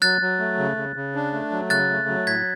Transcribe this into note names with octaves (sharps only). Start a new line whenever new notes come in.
F#3 F#6 A6
F#3
A3
C#3
C#3
C#3
D4
A3
F#3
C#3 F#6 A6
A3
F#3
A2 G#6 B6